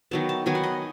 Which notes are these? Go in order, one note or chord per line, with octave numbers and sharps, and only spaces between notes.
D#3 F#3 B3 A5
A5
D#3 F#3 B3 G#5
F#5
D#5